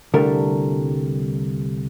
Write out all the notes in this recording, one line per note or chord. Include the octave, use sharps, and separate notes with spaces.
C2 D3 G3 A3 A#4